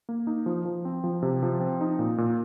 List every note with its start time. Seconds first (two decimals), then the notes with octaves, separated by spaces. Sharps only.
0.09 A#3
0.27 D#4
0.46 F3
0.65 F3
0.85 C4
1.04 F3
1.22 C3
1.43 F3
1.60 C4
1.81 D#4
1.99 A#2
2.18 A#2